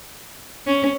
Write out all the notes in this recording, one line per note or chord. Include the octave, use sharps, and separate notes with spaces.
C#4